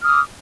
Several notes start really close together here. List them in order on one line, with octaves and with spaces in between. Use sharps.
F6 D#6 D6